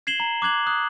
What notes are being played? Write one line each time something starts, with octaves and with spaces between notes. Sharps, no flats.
G#6 C7 E7 F#7 G7
A#5
D6 F#6 G#6 F#7
D#6 F#6